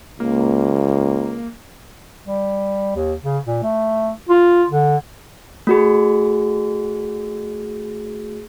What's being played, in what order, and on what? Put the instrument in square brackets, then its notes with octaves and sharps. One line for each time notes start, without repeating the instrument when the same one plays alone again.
[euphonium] C#2 [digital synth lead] A#3
[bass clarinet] G3
D#2
C#3
A#2
A3
F4
D3
[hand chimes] A3 F#4 G#4